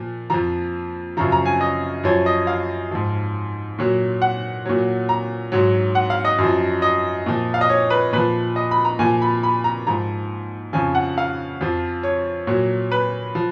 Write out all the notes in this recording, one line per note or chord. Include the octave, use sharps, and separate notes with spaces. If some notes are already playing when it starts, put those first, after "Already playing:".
Already playing: A#2 F3
F2 F3 A#5
F#2 C#3 F3 A#5
A#5
G#5
D#5
F#2 F3 C#5
D#5
F5
G#2 F3
A#2 F#3
F#5
A#2 F#3
A#5
G#2 F#3
F#5
F5
D#5
F#2 F3
D#5
A#2 F3
F5
D#5
C#5
B4
A#2 F3 B4
D#5
B5
A#5
A#2 F3 G#5
B5
B5
A#5
G#2 F3 A#5
F2 C#3 F3 G#5
F#5
F5
F2 F3
C#5
A#2 F#3
B4
F3